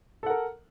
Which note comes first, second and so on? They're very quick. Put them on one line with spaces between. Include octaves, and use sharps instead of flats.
A4 F#5 A#4